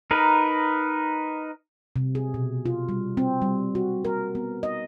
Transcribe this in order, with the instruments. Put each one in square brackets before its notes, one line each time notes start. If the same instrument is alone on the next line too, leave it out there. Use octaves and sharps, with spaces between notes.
[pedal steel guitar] D#4 A#4 B4
[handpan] C3
G#4
B2
F4
G3
C4
G3
F#4
A#4
B3
D#5